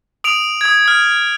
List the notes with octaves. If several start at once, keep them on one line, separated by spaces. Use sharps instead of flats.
D#6 D7 F7
D#6 G#6
D#6 F6